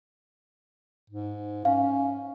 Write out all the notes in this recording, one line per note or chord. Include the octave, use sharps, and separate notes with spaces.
G#2
C#4 F5